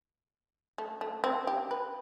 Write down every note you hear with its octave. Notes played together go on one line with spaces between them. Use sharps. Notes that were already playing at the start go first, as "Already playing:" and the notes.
A3
A3
C4
G4
B4